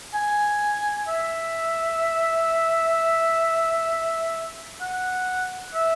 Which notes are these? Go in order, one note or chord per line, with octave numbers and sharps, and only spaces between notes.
G#5
E5
F#5
E5